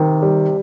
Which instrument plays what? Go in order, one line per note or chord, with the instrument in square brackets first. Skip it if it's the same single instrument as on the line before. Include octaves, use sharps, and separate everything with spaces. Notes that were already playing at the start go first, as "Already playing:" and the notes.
Already playing: [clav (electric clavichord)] C3 [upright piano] D#3
[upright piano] G3